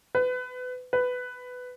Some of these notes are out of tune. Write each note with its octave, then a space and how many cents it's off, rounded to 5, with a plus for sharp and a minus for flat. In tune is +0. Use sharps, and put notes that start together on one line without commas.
B4 +30
B4 +15